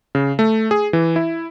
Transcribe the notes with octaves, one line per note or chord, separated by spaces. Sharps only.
C#3
A3
G#4
E3
E4